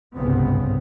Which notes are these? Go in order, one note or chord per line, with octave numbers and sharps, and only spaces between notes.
G1 C2 G#2 C#3 B3 C4